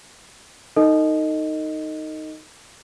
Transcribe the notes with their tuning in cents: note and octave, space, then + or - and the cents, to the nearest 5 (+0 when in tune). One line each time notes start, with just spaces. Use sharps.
D#4 +0 A4 +35 D#5 +0